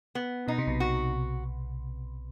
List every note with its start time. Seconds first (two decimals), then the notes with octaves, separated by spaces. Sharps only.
0.15 B3
0.48 B2 D#4
0.58 C3
0.67 B1 B2
0.80 F#4